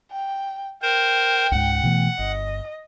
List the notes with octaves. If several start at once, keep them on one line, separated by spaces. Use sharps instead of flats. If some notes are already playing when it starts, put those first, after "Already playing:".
G5
A#4 C5 G5
C#2 G#2 F#5
B2 E3 A3
G1 D#5